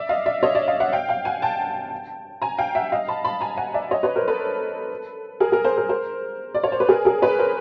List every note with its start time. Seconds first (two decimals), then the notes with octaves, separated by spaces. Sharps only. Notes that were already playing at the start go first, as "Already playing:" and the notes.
Already playing: D5 E5
0.09 D#5 F5
0.26 D5 E5
0.43 C#5 D#5
0.55 D5 E5
0.68 D#5 F5
0.80 E5 F#5
0.92 F5 G5
1.09 F5 G5
1.25 F#5 G#5
1.42 G5 A5
2.42 G#5 A#5
2.58 F5 G5
2.75 E5 F#5
2.92 D#5 F5
3.08 A5 B5
3.25 A5 B5
3.41 G#5 A#5
3.57 F#5 G#5
3.74 D5 E5
3.91 C#5 D#5
4.03 B4 C#5
4.16 A#4 C5
4.28 A4 B4
5.40 G#4 A#4
5.52 G#4 A#4
5.65 A#4 C5
5.77 A#4 C5
5.89 A#4 C5
6.55 D5
6.64 C#5
6.72 C5
6.80 B4
6.89 G#4 A#4
7.05 G#4 A#4
7.22 B4 C#5
7.39 A#4 C5